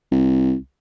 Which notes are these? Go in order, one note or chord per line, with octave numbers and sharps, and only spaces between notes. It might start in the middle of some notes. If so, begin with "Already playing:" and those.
C2